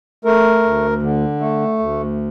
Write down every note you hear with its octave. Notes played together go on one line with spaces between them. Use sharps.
A3 A#4
D2
D3
A3
D2